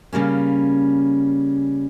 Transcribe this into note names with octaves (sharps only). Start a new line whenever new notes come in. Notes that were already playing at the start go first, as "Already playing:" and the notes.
C#3 G3 A#3 C#4